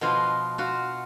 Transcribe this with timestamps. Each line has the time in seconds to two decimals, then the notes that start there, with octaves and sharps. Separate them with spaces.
0.01 B2 F3 F4 D#5
0.58 F4 F#4